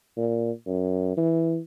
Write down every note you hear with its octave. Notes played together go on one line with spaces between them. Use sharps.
A#2
F#2
E3